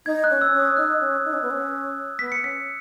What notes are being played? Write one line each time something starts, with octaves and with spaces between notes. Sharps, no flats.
D#4 G#6
F#6
C#4
E6
C#4
D#6
D#4 F#6
C#4
D#4
C#4
B3
C#4
B3 B6
C#7
C#4 B6